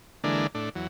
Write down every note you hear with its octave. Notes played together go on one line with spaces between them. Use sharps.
D3 E3 G#3 A#3 D4
A2 D4
E2 F#3